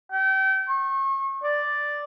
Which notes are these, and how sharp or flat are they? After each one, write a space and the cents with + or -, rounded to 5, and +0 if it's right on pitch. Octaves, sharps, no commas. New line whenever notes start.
G5 -35
C#6 -35
D5 +0